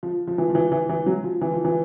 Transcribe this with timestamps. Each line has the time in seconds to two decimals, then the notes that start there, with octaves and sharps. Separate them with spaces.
0.03 F3
0.27 F3
0.38 E3
0.49 F3
0.55 E3
0.72 E3
0.89 E3
1.06 F#3
1.24 F3
1.41 E3
1.53 F3
1.65 E3